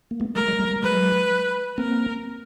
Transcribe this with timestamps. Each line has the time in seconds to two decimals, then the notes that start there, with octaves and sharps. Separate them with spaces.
0.11 A#3
0.20 A3 B3
0.35 G3 A3 A#4
0.48 F#3 G#3
0.59 G3 A3
0.71 G3
0.83 F#3 G#3 B4
1.78 A#3 C4 A#4